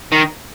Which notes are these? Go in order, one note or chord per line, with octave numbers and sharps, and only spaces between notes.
D#3